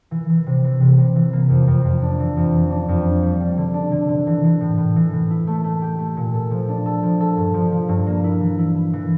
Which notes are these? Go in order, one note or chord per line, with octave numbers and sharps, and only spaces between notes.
E3
E3
C3
E3
C3
C3
E3
A#3
F2
F2
F2
D4
E3
F2
E3
D4
F2
D4
G3
G3
D3
D4
D3
D3
E3
E3
A2
A2
E3
A2
E4
A3
A3
G4
A3
A#2
A4
F3
D4
A4
F3
A4
G2
F3
F3
G2
A#3
E4
E3
E4
E4
E3